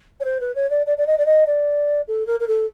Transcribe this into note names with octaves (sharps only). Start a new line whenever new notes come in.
C#5
C5
B4
C#5
D5
D5
D5
D#5
D5
D#5
D5
A4
A#4
A#4
A4